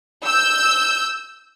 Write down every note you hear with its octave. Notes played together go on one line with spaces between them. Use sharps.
E6 G6